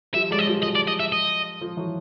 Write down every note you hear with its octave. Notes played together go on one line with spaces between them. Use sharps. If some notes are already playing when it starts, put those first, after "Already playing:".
F3 G3 E5
F#3 G#3 D5
D#5
F3 G3
F3 D#5
D5
D#5
E5
D#5
F3
E3 F#3